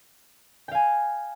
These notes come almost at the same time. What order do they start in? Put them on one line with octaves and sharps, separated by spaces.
G5 F5 G#5